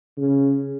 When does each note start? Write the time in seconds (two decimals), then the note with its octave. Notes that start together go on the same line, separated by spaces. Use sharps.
0.17 C#3